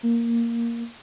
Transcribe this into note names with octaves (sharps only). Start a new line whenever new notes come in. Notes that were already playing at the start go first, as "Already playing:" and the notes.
A#3